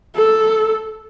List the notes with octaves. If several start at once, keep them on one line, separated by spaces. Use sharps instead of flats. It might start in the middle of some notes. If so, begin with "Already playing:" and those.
A4